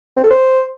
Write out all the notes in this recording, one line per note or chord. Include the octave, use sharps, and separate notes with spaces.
C4
A4
C5